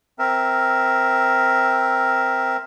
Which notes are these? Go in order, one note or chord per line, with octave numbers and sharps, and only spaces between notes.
C4 A#4 E5